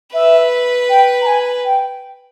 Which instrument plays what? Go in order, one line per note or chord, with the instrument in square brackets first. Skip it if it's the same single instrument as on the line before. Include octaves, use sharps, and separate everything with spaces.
[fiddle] B4 [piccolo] E5
[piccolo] G5
A#5
G#5
G5